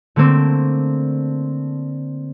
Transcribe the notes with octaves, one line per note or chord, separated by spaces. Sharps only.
D3 A3 A#3 C4